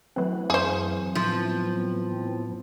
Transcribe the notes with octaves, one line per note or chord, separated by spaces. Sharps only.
E3 F#3 A3 C4 F#5
F#2 G#4 C5
A2 F3 B3